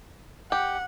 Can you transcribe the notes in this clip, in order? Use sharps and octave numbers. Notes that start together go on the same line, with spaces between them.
G4 F#5